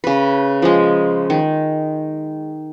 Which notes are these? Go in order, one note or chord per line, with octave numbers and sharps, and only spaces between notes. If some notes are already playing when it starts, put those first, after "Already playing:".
C#3 B4
F3 G#3
D#3